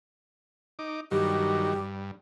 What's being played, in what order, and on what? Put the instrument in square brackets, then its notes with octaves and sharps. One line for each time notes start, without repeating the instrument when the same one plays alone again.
[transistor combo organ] D#4 D6
[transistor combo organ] G2 D#3 F#3 [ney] G4
[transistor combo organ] G2